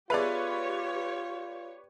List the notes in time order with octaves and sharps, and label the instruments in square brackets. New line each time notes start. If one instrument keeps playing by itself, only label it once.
[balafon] B3 G#4 E5 [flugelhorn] F4 [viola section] G4 C#5 [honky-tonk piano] B4 D5